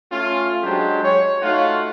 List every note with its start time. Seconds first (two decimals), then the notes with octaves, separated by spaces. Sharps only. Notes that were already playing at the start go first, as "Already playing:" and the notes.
0.12 A3 C#4 F4
0.64 F#3 G#3 D4 G4 C5
1.04 C#5
1.42 A3 D#4 F4 F#4 F5